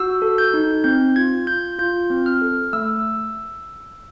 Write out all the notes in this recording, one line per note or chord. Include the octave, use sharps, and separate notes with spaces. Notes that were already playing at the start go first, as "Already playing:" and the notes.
Already playing: F#4 E6
A4
G6
D#4
C4 G6
F4 G#6
F4 G6
F4 G6
C4
F6
A4
A3 E6